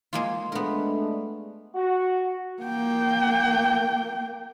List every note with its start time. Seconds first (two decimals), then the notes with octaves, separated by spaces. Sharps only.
0.13 G#3 A#3 F4
0.52 G#3 A3 B3 D4 A#4
1.75 F#4
2.62 A#3 G5